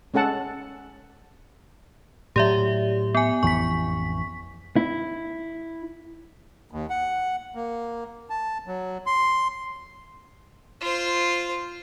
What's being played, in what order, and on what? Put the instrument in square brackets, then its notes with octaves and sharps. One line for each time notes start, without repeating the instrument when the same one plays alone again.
[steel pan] G#3 C#4 A4 F#5 A5
[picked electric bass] A2 F#3 [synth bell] G4 D5 E5
[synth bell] B3 G#5
[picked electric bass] A1 F2 E3 [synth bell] C#6 B6
[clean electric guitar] E4
[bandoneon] D#2
F#5
A#3
A5
F#3
C6
[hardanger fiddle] F4 C5